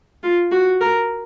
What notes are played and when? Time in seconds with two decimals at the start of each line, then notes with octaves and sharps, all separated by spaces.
0.23 F4
0.52 F#4
0.81 A#4